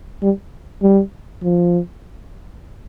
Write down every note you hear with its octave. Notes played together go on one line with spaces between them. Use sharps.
G3
G3
F3